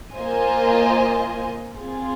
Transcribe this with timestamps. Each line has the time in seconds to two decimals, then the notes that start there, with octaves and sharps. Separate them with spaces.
0.14 A#3 F4 C5 D#5 G#5
1.76 C4 F4 G#4